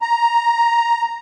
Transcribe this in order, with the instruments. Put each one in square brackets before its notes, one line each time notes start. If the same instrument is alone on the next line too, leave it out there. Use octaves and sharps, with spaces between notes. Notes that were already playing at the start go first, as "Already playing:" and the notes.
[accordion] A#5